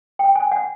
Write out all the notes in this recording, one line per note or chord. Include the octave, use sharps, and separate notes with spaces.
G5
G#5
F#5